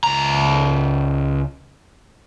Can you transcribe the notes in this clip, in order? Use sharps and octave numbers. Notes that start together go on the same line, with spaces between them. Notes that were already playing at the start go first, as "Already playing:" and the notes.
C#2 A#5